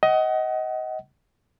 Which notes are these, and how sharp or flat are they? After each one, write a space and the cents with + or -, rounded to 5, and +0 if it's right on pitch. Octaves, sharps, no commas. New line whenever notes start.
D#5 +20 F#5 +30